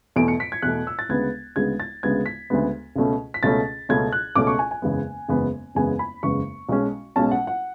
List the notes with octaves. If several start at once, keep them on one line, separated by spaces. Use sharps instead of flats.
E2 B2 A3 D7
C#7
B6
G#6
E2 B2 A3 F#6
E6
A6
D2 C#3 G#3 B3 G#6
D2 C#3 G#3 B3 G#6
A6
D2 C#3 G#3 B3 G#6
B6
D2 C#3 G#3 B3
C#2 B2 A3 C#4
B6
C#2 B2 A3 C#4 A6
C#2 B2 A3 C#4 G#6
F#6
C#2 B2 A3 C#4 D6
C#6
G#5
G#5
F#1 E2 C#3 G#3 B3
F#1 E2 C#3 G#3 B3
F#1 E2 C#3 G#3 B3 G#5
B5
F#1 E2 C#3 G#3 B3 C#6
B1 B2 G#3 C#4
B1 B2 G#3 C#4 A5
F#5
F#5